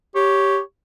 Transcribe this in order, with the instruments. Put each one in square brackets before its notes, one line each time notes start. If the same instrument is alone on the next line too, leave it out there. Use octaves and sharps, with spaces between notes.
[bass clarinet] G4 [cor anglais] C#5